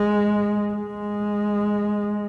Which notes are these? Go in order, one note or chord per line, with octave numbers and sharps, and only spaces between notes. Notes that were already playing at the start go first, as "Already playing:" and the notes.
Already playing: G#3
G#3